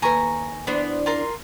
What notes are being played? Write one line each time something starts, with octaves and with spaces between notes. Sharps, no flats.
D#2 B4 G#5 A#5 C#6
E2 B3 D4 C5
F4 A#4 C6